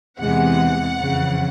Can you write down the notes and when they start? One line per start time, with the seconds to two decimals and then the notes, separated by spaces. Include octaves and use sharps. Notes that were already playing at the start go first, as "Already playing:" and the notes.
0.20 E2 C3 E3 G#3 F#5
0.99 F2 C#3 E3